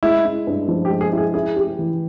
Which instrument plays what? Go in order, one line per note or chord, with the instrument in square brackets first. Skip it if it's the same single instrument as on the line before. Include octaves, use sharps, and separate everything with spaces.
[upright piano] G#3 [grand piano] E4
[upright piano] E4
G2
F3
[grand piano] G4
[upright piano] G#3
[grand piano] G#4
[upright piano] E4 [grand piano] G4
[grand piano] G#4
[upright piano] E4 [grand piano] G#4
[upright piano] G4
E3